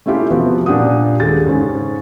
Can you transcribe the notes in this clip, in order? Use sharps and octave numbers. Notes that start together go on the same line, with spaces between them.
A3 C#4 E4 F4 G4
C3 F3 B3 C4 F#4
A#2 D4 G4 F#5 D#6
D#1 G#3 G4 A4 A6
G#2 C#3 C#4